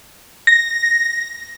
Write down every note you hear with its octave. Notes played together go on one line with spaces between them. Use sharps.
A#6